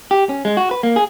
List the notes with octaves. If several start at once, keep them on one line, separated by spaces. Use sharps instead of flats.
G4
C#4
G#3
F#4
B4
A#3
G#4